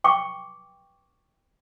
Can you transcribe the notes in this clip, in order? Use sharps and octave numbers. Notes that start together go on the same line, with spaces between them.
G5 C#6 D6